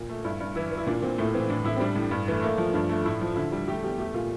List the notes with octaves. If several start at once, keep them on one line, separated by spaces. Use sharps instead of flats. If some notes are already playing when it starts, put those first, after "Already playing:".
Already playing: A#2
A3
G2 E4
G2
E3 E4
E3
E4
A#2 D4
A#2 C4
A2 A3
E3 C4
A2 D4
A2 E4
C4
G3 D4
A2
G2
E3 A3
A3 A#3
F3
G2 D4
A3
A2 E4
F3
D3 E4
G3
A3 G4
E2 G4
A3 G4
A#2 F4